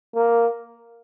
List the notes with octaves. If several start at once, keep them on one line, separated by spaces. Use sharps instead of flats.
A#3